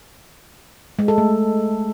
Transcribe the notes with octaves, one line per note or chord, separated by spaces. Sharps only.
G#3
A4
A3